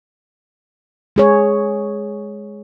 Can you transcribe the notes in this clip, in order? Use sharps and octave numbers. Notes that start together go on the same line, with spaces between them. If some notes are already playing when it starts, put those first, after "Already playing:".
G#3 G#4 C#5